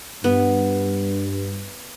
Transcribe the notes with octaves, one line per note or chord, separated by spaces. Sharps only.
G2 B3